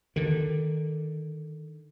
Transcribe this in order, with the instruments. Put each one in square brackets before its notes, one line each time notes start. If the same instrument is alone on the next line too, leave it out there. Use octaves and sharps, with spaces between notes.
[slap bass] D3 D#3